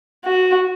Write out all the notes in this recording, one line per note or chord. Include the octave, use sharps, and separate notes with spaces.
F#4